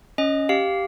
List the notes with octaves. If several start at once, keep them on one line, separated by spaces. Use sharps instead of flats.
C#4 D#5
G4 F5